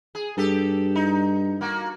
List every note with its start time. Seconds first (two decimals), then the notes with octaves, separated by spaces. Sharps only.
0.15 G#4
0.38 G2 G4 A4
0.95 D#4
1.61 A#3 F#4